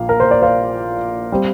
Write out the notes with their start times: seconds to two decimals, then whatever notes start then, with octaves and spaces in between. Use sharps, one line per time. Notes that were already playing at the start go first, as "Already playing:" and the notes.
Already playing: A#1 A#2 A#3 F5
0.09 A#4
0.20 C5
0.31 D5
0.42 C5 F5
1.32 G3 C4